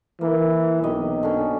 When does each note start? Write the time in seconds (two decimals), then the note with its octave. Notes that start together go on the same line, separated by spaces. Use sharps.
0.21 E3 A#3
0.83 B1 C3 D#5
1.23 D3 C#4